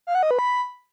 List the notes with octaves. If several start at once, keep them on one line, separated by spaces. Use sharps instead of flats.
F5
F#5
D#5
B4
B5